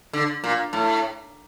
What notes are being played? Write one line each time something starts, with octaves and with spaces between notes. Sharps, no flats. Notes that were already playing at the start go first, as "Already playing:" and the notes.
D3
A#2
A2